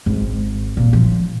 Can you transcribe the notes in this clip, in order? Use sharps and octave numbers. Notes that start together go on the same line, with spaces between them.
G#1
A#2
F3